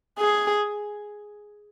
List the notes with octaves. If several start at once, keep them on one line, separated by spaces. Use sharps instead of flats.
G#4